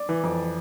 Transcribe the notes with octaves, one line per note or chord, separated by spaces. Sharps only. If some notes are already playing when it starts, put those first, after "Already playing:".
Already playing: D5
E3
F2